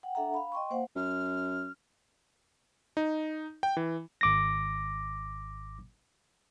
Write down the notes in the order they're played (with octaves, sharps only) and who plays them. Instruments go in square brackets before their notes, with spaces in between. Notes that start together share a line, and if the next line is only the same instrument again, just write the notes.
[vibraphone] F#5 G5
D4 A4 E5 F#5 A#5
F5 B5
D#5 G5 C6 C#6
A#3 C5 F5 F#5
[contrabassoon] F#2 [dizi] F6
[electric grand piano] D#4
G5
E3
[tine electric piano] G#1 D6 A#6